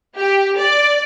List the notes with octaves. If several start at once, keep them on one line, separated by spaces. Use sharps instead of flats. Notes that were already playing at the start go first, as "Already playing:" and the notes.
G4
D5